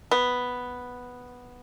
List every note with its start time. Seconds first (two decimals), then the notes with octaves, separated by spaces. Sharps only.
0.11 B3